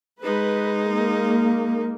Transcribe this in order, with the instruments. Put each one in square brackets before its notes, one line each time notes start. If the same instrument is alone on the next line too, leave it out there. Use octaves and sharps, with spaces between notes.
[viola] G#3 D#4 [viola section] B4
[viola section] A#3